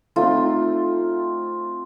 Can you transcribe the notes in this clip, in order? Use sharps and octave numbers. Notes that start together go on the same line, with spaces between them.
A3 C4 D#4 F4